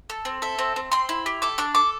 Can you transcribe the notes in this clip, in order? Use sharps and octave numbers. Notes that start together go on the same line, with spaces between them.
A4
C4
A4 E5
C4
C4
C4 C6
E4
G4
A4 D6
D4 D6
A4 D6